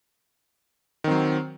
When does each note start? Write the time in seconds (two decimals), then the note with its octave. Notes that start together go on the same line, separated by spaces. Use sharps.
1.04 D#3
1.08 C4
1.11 F#3